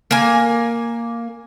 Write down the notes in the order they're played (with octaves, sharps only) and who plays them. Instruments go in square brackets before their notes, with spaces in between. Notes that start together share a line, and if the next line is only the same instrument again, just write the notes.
[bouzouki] A#3 G#5